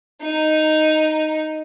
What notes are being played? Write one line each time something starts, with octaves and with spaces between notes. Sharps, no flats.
D#4